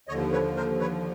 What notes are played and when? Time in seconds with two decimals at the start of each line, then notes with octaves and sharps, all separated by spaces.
0.08 D#2 D3 F3 C#5 D#5
0.32 B4 C#5
0.56 A#4 C5
0.79 B4 C#5